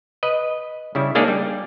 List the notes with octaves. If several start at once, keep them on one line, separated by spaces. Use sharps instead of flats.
B4 D#5
C#3 G3 E4
G#3 A#3 D4 D#4 G#4 D5
G3